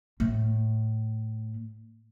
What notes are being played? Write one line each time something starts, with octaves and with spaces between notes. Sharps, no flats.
A2